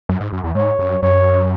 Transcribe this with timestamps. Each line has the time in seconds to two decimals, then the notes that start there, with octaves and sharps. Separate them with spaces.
0.09 F#2
0.21 G#2
0.33 F#2
0.44 E2
0.55 G#2 C#5
0.79 F#2
1.03 F#2 C#5